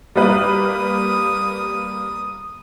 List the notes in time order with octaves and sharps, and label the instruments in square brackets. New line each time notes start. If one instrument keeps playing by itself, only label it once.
[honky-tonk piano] G3 A#3 B4 [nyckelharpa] D#6